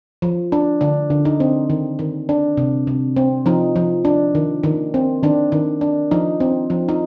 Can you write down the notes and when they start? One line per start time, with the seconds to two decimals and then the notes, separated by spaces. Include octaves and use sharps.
0.22 F3
0.52 D4
0.81 D3 D4
1.10 D3
1.25 D#4
1.40 C4
1.70 D#3
1.99 D#3
2.29 D4
2.57 C3
2.87 C3
3.16 C4
3.46 F3 D#4
3.76 F3
4.05 D4
4.35 D#3
4.63 D#3
4.94 C4
5.23 D#3 D4
5.52 D#3
5.81 D4
6.11 F3 D#4
6.40 C4
6.70 F3
6.89 D#4